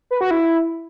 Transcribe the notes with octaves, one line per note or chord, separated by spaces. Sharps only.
B4
F#4
E4